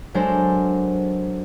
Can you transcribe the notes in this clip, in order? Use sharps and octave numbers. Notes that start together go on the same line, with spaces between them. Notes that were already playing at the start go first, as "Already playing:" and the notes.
F#3 G#3 D4 A4 A#4 C5